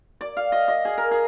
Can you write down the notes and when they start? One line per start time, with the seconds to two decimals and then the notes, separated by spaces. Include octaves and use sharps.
0.21 D5
0.37 F5
0.52 D#5
0.68 D#5
0.85 G#4
0.98 A#4
1.11 G#4